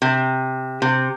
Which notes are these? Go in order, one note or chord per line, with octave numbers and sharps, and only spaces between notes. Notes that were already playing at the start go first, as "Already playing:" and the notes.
C3
C3